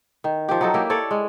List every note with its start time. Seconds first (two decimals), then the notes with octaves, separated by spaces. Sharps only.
0.24 D#3
0.49 F3 G4
0.61 F#3 D#4 A4
0.74 A#3 E4 G4
0.90 A4 C#5 D5
1.11 G#3